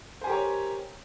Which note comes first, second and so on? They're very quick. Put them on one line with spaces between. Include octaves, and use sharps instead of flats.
C5 G#5 G4 A#4 C#5